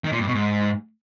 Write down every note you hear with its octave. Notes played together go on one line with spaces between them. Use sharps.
D#3
A#2
G2
B2
G#2